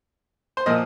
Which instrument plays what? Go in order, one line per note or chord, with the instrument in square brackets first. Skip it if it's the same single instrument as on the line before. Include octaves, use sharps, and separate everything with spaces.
[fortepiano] C5
A#2 F3 A#3 D#5